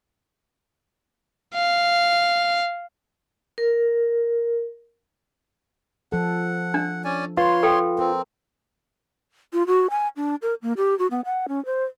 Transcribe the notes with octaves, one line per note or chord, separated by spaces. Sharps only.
F5
A#4
F3 A4 F#5
D4
C#4 D5 G#5
F4 B4 C#5 C6
A4 G5
C4 A#4
F4
F#4
G#5
D4
A#4
A#3
G4
F#4
B3
F#5
C#4
C5